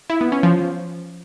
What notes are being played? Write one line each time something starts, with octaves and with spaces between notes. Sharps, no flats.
E4
B3
C#4
F3